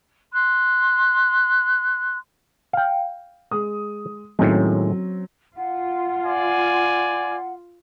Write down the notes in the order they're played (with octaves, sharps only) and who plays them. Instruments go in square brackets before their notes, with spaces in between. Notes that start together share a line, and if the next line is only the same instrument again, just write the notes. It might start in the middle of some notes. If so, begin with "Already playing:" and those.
[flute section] C6 F#6
[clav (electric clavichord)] F5 G5
[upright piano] G#3 D#6
[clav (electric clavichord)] A2 D#3 G#3 [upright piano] F#3 C4 C#4
[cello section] F4 [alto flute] F#5
[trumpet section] D5 G#5